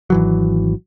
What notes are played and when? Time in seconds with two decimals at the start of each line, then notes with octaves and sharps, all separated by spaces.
0.10 G#1 E3 F#3